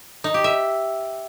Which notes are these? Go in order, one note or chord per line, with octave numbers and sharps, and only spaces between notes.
D#4
G4
E5